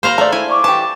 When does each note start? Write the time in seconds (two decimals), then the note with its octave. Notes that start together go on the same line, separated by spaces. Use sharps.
0.03 A#3 F#4 C5 F5 A#5 B5
0.18 A3 D5 A#5
0.32 E4 G#5
0.51 C#6 D6
0.64 E3 G4 A5